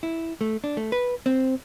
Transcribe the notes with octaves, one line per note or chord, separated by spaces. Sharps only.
E4
A3
D4
A3
B4
C4